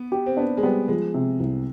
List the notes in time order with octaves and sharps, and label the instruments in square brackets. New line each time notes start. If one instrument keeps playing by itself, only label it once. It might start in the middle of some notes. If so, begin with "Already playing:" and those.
Already playing: [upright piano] B3
[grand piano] G4
[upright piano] C4
[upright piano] B3 [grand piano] D4
[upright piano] G#3
[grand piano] G3 [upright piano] B3
[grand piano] F3 [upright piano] G#3
[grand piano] C3
C2